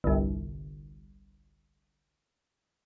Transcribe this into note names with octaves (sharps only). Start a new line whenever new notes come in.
G1 C2